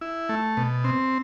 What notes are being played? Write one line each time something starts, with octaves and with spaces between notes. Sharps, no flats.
E4
A3
B2
C4